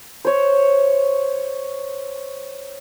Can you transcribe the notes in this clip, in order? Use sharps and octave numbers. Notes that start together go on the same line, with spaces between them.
C5 C#5